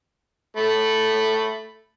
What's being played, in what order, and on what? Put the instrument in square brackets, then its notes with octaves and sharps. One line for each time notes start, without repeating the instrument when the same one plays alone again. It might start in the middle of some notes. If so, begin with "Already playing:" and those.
[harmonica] A3 B5